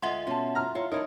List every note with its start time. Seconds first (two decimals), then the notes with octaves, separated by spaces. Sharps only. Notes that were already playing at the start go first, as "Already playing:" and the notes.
0.02 D2 G#3 F4 D#5 E5 F#5 C6
0.27 B2 C#4 F4 A5
0.55 A#5 F6
0.75 E4 F4 C#5
0.92 A3 D#4 E4 A#4 C#5